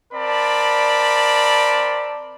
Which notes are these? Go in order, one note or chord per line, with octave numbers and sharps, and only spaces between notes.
C4 A#4 D5 A5 B5